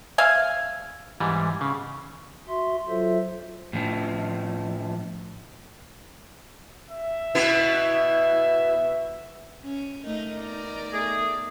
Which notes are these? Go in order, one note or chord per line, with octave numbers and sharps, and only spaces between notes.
E5 F5 G#5
G#2 E3 G3
C#3
F#4 E5 C6
F#3 F4 A4 C5 E5
A2 F3
E5
B2 B3 E4
C#4
A3 D#4 A#4
B3 D#4 D5
A3 G#4